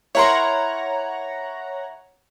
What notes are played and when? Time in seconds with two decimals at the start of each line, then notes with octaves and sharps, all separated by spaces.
0.15 E4 A#4 C#5 F#5 A#5 C6